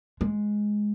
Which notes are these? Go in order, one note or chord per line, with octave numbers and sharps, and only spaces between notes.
G#3